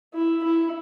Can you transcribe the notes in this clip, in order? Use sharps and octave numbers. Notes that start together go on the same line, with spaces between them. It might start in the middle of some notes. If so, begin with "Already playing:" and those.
E4
E4